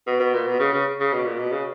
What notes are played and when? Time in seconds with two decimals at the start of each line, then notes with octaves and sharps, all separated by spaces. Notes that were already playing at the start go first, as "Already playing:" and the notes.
0.07 B2
0.20 B2
0.33 A#2
0.47 B2
0.60 C#3
0.73 C#3
1.00 C#3
1.13 B2
1.25 A#2
1.39 B2
1.52 C#3